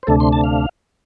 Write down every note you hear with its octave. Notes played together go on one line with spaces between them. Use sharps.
C5
D2 C3 A3 D4 A4
C6
A5
F5